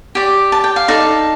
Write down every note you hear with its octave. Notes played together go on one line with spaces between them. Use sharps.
G4 D5
A5
G5
F5
D#4 A4 D5